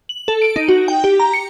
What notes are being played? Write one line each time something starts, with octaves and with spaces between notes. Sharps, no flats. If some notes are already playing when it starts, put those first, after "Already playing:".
F#7
A4
D7
D#4
F#4
G5
G4
A#5
C#7